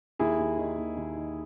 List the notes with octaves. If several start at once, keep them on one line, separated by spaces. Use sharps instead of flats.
D#2 E4 G#4
D#2
D#3
D#2
D#2
D#3